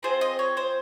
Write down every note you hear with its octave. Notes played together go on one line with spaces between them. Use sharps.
C4 F4 G#4 C5
D#5
C#5
C5